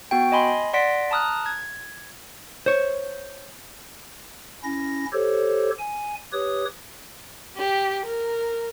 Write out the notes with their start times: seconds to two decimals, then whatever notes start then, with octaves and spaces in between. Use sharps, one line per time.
0.11 B3 F#4 G5
0.32 D#5 G#5 B5 C6
0.73 D5 F#5 C6 A#6 B6 D7
1.11 A5 A#5 D#6 F6 F#6
1.46 G#6
2.66 C5 C#5
4.64 C#4 E4 A#6
5.13 G4 A4 C5 C#5
5.79 G#5
6.33 G4 B4 C#5 D#6
7.56 G4
8.05 A#4